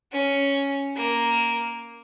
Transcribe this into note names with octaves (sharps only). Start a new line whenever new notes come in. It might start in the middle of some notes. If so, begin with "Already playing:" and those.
C#4
A#3